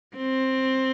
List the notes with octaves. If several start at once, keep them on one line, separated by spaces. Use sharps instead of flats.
C4